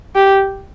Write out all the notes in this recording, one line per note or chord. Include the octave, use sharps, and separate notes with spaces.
G4